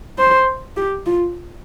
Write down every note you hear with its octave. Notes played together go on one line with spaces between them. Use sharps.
C5
G4
F4